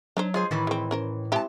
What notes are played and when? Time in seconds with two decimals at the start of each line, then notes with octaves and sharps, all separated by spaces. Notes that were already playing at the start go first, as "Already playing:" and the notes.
0.17 F#3 D4 D#4 C5
0.34 G#3 F4 G#4 C5
0.51 A2 D#3 E3 E4
0.67 G#3 C4
0.91 C#4 A#4 C5
1.32 G#3 C4 E4 G4 A5